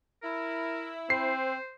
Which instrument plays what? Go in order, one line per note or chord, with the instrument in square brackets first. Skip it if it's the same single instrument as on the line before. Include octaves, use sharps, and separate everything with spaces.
[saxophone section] E4 [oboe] A#4
[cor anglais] C4 [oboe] C5 [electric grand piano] C7